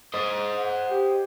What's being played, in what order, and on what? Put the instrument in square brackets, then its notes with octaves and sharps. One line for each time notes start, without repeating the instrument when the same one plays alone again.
[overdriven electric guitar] C5 D#5
[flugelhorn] F#5
G4